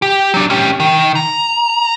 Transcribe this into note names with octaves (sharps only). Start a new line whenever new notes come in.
G4
F#3 D4
C#4 G4
D#3
A#5